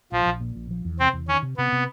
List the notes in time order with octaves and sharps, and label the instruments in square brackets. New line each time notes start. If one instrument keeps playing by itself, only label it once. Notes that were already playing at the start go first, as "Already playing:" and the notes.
[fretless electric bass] A#1 [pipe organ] F3
[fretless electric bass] A#1
A#2
A#1
F3
E2
[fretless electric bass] C3 [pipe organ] C4
[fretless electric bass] E2
[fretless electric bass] D#3 [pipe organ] C#4
[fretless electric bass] C3
[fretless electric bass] C3 [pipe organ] B3
[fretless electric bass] C3